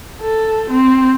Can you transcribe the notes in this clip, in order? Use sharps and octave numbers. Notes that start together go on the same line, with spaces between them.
A4
C4